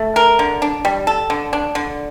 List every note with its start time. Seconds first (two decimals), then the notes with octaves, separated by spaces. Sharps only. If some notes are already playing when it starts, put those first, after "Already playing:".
Already playing: A3
0.16 A#4
0.39 D3
0.62 D4
0.85 G3
1.07 A4
1.30 D3
1.53 D4
1.75 D3